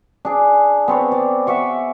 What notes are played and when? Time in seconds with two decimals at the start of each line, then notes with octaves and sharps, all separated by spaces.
0.25 D4 G#4
0.88 B3 C4 C#5
1.12 D5
1.47 E5 F#5 C#6 D6